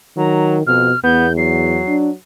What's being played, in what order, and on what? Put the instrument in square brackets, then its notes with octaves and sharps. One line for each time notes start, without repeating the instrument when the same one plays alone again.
[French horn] D#3 [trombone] F#3 [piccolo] A#5
[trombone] F2 [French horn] B2 [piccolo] F6
[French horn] E2 [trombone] B3 [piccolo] G6
[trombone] F#3 [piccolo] C7
[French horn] D4